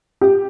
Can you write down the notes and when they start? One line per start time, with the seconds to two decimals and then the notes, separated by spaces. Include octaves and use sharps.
0.21 G4